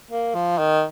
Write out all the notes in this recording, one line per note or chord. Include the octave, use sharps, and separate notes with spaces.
A#3
F3
D#3